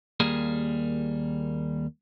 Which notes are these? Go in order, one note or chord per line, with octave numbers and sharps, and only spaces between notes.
D#2 G3 A#3 G#4